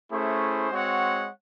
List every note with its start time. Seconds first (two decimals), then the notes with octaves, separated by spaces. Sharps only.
0.11 A3 C#4 E4 G#4 C5
0.70 G#3 C4 F#4 C#5 F#5